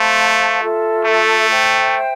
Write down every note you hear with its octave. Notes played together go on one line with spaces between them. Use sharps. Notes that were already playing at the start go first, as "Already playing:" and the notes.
Already playing: A3 C5 F5 A5 C6
F4 A4 E5
A3
C5 E5 G5